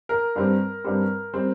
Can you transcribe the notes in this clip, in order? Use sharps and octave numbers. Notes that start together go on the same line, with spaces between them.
A#4
G2 G3 C4
G2 G3 C4
G3 C4